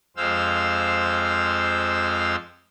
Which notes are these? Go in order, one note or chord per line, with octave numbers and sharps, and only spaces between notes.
F2 G#3 C5 F5 E6